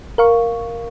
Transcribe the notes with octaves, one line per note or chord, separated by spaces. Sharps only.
A#4 F5 C#6